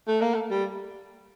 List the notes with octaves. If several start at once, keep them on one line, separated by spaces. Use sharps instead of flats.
A3
A#3
A3
G3